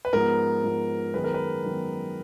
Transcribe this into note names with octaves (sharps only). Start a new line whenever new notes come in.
B4
G#2 F3 B3 A#4
G#2 F3 B3
F#2 D#3 G#3 B3 B4
A#4
B4
F#2 D#3 G#3 B3